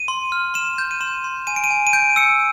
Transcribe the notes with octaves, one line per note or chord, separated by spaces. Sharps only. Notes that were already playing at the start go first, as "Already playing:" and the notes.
Already playing: D#7
C6
F6
C6 E7
G6
D#7
C6 E7
C6
G#5 D#7
D7
D#7
G#5
D#7
G6 D7
E6 C#7